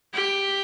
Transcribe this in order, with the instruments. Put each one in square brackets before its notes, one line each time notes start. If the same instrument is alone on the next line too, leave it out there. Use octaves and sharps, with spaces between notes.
[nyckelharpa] G4